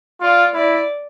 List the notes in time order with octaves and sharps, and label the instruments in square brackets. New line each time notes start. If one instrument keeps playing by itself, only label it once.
[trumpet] F4 [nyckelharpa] D5
[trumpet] E4 [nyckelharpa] D5